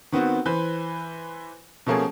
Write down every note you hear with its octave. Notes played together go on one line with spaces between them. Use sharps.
D#3 B3 C4 F#4
E3 B4 C5
B2 F3 A3 A#3 C#4 G#4